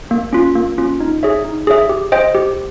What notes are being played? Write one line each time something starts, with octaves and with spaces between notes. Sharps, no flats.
A#3
C#4 F4
A#3
C#4 F4
D#4
G#4 C#5 E5
D#4
G#4 C#5 E5
G4
C5 D#5 G5
G4